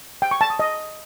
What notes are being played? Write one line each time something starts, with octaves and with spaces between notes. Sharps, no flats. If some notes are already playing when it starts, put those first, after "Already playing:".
G5
C#6
A5
D#6
D#5